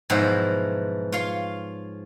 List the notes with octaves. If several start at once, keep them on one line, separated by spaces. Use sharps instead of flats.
G#2 B2 F3 F#3 E4 C5
F4 C#5 F5 C6